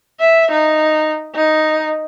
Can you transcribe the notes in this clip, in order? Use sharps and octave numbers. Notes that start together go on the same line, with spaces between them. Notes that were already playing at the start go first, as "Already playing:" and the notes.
E5
D#4
D#4